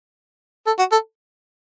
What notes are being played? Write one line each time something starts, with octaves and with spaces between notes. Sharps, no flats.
A4
F#4
A4